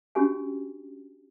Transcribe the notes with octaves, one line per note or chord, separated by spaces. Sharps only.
C#4 D4 F#4 G4 G5 G#5